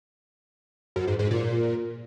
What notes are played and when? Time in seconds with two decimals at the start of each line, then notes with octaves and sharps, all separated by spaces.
0.96 F#2
1.08 G#2
1.19 G#2
1.31 A#2